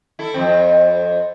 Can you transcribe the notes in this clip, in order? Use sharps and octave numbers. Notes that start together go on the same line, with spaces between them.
E4 A4
F2 C4